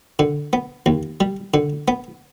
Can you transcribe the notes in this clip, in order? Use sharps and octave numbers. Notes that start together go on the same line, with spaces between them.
D3
B3
D#2
G3
D3
B3